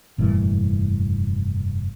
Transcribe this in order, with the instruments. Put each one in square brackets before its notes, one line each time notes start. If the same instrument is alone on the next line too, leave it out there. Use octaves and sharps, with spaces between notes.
[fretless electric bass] F1 G2 A#2 E3